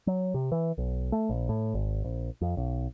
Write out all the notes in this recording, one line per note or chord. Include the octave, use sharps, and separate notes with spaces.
F#3
C3
E3
B1
A3
A#1
A2
G#1
A#1
F2
B1